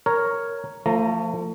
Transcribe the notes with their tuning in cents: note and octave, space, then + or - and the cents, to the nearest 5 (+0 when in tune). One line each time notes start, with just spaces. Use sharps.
A#4 +0 C#5 +0
F3 +0 A3 +35 A#5 +0